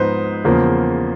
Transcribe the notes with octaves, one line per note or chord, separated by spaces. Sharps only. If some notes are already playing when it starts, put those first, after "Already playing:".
Already playing: G#2 F3 G#3 B3 D#4 B4 C5
E2 C#3 F3 A#3